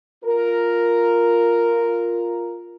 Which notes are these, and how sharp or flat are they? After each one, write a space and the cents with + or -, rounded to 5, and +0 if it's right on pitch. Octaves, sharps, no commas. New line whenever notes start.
F4 +0 A#4 +0